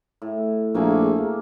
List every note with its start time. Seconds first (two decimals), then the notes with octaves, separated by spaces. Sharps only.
0.22 A2
0.74 A#1 A3 A#3 G#4
1.18 A#3